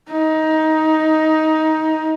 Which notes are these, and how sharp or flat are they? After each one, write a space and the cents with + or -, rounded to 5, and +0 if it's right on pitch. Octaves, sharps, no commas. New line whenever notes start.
D#4 +15